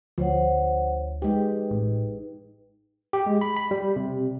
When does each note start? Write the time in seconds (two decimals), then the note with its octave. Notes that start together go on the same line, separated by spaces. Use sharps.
0.18 D2 F3 C5 C#5 F#5
1.22 G#3 D#4 G4 B4
1.70 A1
3.13 G4
3.26 G#3
3.41 B5
3.56 B5
3.71 G3
3.96 C3